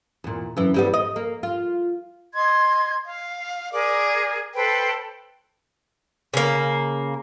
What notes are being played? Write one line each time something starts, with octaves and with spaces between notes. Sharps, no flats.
E2 A#2
F#2 E3
E3 G3 B3
D#5
A#3
F4
D#5 C6 G#6
F5
G#4 A#4 D5
A4 B4 C5 G5
C#3 A#3